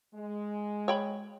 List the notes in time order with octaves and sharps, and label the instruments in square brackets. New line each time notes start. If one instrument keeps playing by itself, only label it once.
[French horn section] G#3
[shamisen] C#5 G5 B5